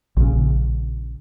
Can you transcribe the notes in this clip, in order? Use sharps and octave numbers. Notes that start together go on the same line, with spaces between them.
A#1 C#3